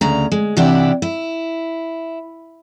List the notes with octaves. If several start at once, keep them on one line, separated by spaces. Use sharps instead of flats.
D2 C#3 A#5
G#3
C3 E3 D4 E4 G4 F#5
E4